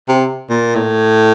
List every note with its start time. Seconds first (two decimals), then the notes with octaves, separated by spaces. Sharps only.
0.09 C3
0.50 A#2
0.75 A2